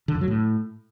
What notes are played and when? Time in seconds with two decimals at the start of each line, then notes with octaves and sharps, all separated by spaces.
0.08 D3
0.15 F2
0.21 F#3
0.28 A2